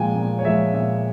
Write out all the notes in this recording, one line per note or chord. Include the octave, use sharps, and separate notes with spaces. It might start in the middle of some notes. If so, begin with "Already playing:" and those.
Already playing: A#2 F3 G#3 G5 G#5
A#2
C#5
F3 G#3 E5
A#2 E5